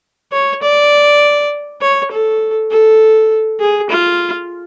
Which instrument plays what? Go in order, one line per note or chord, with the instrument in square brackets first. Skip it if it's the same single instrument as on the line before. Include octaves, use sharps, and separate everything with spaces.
[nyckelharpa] C#5
D5
C#5
A4
A4
G#4
F4